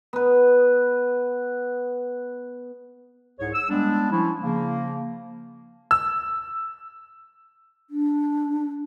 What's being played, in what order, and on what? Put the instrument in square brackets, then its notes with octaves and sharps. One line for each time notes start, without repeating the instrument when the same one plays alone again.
[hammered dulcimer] B3 B4
[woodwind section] C2 G#2 G#4 C#5
E6
G3 G#3 B3 D4
F3 C#4 E4
C#3 F3 A#3
[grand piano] E6
[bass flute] D4